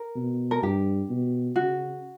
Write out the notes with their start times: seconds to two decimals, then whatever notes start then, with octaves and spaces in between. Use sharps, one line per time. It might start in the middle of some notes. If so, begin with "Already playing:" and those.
Already playing: A#4
0.15 B2
0.51 A#4
0.62 G2 G4
1.09 B2
1.56 C#3 F#4